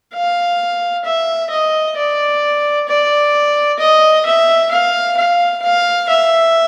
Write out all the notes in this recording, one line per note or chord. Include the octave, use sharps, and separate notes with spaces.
F5
E5
D#5
D5
D5
D#5
E5
F5
F5
F5
E5